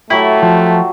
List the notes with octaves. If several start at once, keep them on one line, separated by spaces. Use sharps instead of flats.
F#3 A3 E4 F#4 G4
F3